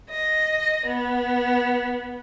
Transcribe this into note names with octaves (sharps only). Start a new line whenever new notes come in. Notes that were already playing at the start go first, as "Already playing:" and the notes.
D#5
B3